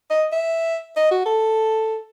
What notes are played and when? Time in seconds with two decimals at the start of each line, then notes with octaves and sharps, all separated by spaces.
0.10 D#5
0.32 E5
0.97 D#5
1.11 F#4
1.26 A4